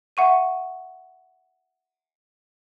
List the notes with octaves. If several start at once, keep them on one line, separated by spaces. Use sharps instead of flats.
E5 F#5 C#6 D#7